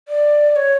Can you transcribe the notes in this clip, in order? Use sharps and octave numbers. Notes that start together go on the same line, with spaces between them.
D5
D5
C#5